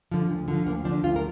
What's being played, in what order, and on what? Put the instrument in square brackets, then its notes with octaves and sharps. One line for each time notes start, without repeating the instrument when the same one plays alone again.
[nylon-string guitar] D3 F3
D2
D3 F3
D2 A#3
F3 D4
D3
D2 F4
A#4